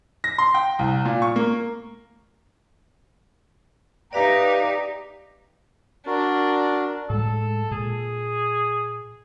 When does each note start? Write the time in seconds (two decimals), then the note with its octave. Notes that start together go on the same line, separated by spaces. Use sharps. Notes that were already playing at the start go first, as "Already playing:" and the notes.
0.24 A#6
0.38 C6
0.54 G5
0.79 C2
1.05 A#2
1.22 C#6
1.36 A#3
4.13 D#4 G4 B4 D5 E5 F5 A#5
6.07 D4 F#4 A#4
7.10 A2 G#3 A4
7.71 A#2 G#4